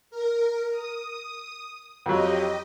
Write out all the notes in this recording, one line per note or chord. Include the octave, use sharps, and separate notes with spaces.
A#4
D#6
F2 F#3 G4 D#5